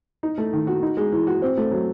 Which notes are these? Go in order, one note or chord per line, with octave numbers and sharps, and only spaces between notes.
D#4
A3
D#3
F#4
D#4
G#3
E3
F#4
C4
A3
F#3